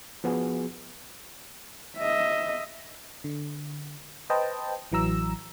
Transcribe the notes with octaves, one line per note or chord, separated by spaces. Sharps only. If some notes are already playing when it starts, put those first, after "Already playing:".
F3 B3 F#4 G#4
D#5 E5
D3
B4 C5 D#5 G5 A5
A1 E3 F#3 A#5 E6